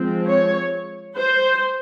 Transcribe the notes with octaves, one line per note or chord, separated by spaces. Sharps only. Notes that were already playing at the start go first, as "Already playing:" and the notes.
Already playing: F3 G#3 C4
C#5
C5